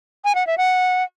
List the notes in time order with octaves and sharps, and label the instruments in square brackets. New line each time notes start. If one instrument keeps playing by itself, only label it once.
[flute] G#5
F#5
E5
F#5